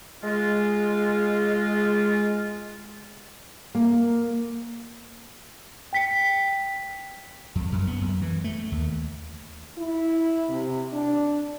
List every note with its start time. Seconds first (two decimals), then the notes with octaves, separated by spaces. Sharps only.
0.23 G#3 F4
3.75 A#3
5.93 G5 B6 C#7
7.55 F2
7.72 F#2
7.87 B3
8.01 F#2
8.22 E3
8.44 A3
8.72 D#2
9.78 E4
10.49 C3
10.93 D4